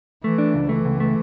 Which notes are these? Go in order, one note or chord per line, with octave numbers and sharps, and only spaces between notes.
E3 A3
D4
C#2
E3 A3
C#2
A3